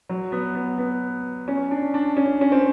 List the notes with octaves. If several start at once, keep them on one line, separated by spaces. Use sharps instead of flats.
F#3
B3
B3
B3
C#4
D4
D4
C#4
C#4
C4